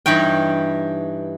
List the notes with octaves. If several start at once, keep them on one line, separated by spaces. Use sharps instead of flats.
G2 E3 D#4 C#5 G5